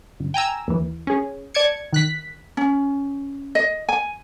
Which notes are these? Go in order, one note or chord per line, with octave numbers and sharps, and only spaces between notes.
G1
G5 G#5 A#5 E6
D#2 E3
C#4 G#4
D5 A5 D6 G#6 C#7
D#3 F#6 B6
C#4
D#5
G#5